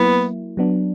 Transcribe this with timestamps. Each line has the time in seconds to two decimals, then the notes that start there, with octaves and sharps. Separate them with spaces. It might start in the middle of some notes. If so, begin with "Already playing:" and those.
Already playing: F#3 A#3 B3 E4
0.57 F#3 B3 D4